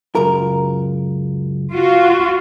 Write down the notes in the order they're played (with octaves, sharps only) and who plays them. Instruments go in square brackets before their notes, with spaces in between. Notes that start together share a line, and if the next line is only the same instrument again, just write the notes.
[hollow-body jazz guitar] C#2 F#2 A#4
[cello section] F4 F#4